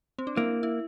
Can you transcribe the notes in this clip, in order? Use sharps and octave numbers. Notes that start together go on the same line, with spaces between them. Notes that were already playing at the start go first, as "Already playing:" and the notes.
C4
D4
A#3 E4
E4